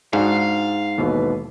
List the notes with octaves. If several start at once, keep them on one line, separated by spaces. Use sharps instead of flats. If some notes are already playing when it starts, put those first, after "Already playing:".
G#2 D4 F#4 G#4 F5
D#2 B2 E3 G#3 A4 B4